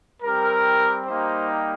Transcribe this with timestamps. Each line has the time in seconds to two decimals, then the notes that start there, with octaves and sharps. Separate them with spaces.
0.22 G3 C4 G4 A#4
1.07 G3 A#3 D#4 G4 C5